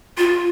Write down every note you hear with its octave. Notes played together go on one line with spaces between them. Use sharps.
F4